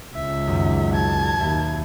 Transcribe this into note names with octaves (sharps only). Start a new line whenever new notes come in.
C#2 E5
B1 F#2 D#3
A5 G#6
D#2 E5 B5 G6